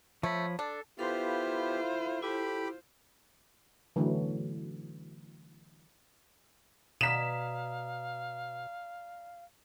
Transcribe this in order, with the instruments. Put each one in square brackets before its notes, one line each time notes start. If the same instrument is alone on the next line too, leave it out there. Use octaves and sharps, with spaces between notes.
[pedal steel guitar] F3 C#5 B5 [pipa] A3
[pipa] D4 [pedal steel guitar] A4
[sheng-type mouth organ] B3 G4 [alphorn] E4 [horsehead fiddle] F4 C5 [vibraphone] A4 F5 C6
[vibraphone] E4 [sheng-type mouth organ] G4 B5 D6 [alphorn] A4
[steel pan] D3 E3 F#3 A3
[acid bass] B2 [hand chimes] D5 A#5 D#6 [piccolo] F5 [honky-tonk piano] B6 E7